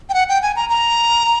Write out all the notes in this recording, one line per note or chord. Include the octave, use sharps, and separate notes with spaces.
G5
F#5
G5
G#5
A#5
A#5